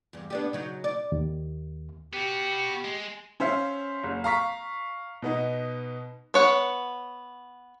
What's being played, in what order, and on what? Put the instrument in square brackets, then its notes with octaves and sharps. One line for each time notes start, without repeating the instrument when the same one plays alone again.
[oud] E2 G2
B3 D4 G4
C#3 F#3 D#4
D5
[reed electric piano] D#2
[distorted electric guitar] B3 F#4 [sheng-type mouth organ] G4
[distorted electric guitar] G#3
[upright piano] C#4 C5 E5 F5
F#1
F5 A#5 C#6 B6
B2 B3 D#4
[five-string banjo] B3 C#5 F#5